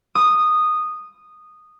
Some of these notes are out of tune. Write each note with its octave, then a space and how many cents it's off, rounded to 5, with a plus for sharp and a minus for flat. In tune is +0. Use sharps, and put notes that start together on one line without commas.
D#6 -10